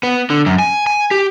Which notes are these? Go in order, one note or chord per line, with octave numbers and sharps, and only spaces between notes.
B3
D3
F#2
G#5
G#5
G4